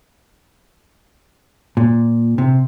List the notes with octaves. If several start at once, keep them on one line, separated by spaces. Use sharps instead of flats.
A#2
C3